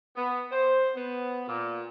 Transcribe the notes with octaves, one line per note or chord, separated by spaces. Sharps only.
B3
C5
B3
A#2